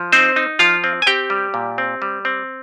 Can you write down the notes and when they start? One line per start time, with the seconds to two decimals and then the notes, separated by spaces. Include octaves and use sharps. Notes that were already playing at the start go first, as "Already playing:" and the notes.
Already playing: F3
0.12 C4 D#4 C5
0.36 D#4
0.59 F3 F4 F5
0.84 C4
1.02 G#5
1.07 C4 G4 G5
1.30 G3
1.54 A#2
1.78 C4
2.02 G3
2.25 C4